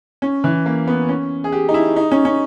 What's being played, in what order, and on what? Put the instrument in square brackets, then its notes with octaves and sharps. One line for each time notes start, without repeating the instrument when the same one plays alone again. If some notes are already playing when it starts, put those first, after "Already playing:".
[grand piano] C#4
E3
A#3
B3
C#4
G#4
G4
D#4
E4
D#4
C#4
C#4